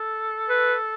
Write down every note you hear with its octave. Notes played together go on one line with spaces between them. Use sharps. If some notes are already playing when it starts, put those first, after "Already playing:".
Already playing: A4
B4